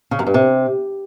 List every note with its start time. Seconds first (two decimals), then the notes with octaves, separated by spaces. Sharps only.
0.11 C#3
0.19 F#2
0.27 G2
0.34 C3